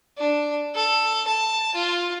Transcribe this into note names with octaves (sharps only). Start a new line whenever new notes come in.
D4
A4
A5
F4